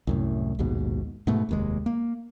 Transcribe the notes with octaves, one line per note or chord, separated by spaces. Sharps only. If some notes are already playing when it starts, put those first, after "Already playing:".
C2 F#2 A2
A#1 D#2 G#2 B2
G#2 B2 A3
F1 D#2 G#3
A#3